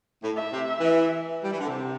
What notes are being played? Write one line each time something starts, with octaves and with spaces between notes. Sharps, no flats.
A2
E5
C3
E3
G3
E3
D3
C3